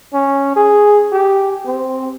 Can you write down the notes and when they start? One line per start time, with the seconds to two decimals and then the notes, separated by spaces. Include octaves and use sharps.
0.14 C#4
0.56 G#4
1.12 G4
1.66 C4